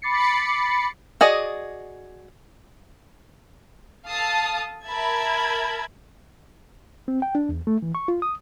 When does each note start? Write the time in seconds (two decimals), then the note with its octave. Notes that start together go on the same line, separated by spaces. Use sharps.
0.02 B5 D6 A6 C7 C#7
1.21 F#4 G#4 D5 D#5
4.07 A4 F5 A5 D#6
4.87 A#4 E5 A5 B5 G#6
7.08 C4
7.22 G5
7.35 D4
7.49 E2
7.67 A3
7.82 E3
7.95 C#6
8.08 F4
8.22 D#6